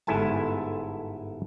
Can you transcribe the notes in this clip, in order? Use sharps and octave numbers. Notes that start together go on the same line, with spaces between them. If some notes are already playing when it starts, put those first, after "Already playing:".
G1 G#2 E4 A4 G#5 A5